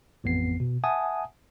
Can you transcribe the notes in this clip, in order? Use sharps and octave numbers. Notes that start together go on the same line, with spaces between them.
A1 F2 B3 C7
B2
E5 F#5 G#5 A5 D#6